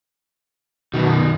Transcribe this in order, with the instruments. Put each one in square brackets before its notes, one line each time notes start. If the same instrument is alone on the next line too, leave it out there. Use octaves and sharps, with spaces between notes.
[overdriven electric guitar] F#2 D#3 [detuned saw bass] B2